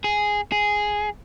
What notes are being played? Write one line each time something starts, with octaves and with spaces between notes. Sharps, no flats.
G#4
G#4